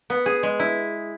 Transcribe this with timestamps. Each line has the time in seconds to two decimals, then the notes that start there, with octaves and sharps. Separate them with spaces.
0.10 B3
0.26 G#4
0.43 G#3
0.59 E4